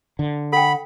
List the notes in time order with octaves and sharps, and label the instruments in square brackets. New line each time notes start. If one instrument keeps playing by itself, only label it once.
[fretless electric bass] D3
[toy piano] A4 G5 [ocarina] F#5 [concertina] B5